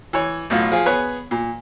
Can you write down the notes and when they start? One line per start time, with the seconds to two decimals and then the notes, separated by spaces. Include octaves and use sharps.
0.13 E3 C#5
0.50 B1 A2 F4
0.72 F3 F4 G#4
0.86 B3 G#4 B4 C#5 G#5
1.31 A#2